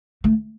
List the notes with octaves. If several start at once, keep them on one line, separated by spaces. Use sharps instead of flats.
A3